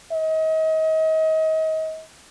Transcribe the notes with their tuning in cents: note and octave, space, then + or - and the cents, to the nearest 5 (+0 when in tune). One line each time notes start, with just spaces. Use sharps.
D#5 +35